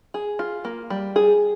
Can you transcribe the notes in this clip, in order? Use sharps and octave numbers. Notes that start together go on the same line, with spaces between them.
G#4
F4
A#3
G3
G#4